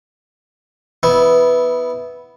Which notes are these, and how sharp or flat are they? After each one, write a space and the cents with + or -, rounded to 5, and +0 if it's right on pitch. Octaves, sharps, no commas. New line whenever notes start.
B3 +0 E4 -15